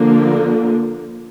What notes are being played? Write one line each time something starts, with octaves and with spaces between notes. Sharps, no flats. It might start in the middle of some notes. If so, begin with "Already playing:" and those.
Already playing: D3 F3 A#3